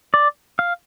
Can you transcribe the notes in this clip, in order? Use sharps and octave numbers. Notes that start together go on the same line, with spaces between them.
D5
F5